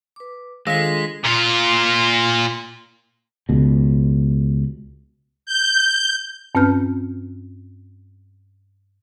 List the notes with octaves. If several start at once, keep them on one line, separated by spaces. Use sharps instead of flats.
B4 D6
D#3 G#3 D4 F4 A4 F5 A#6 B6
A#2 F4
C#2 B2
G6
G2 C4 C#4 B4 F6 G6